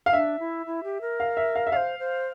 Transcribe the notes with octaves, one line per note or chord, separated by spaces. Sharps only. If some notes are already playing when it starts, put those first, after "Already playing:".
F5
D4 E5
E4
E4
G4
A#4
F5
E5
F5
E5
C5 D5 F5
C5